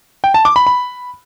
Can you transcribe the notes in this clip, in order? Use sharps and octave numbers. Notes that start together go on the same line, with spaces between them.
G5
A5
D6
B5
B5